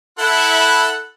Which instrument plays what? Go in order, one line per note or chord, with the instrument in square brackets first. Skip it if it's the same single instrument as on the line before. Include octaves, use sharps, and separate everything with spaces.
[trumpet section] E4 [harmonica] A4 F#5